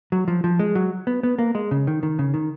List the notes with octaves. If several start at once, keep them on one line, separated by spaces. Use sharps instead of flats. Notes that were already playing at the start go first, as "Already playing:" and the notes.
F#3
F3
F3
G#3
F#3
B3
B3
A#3
G#3
C#3
D#3
D#3
C#3
D#3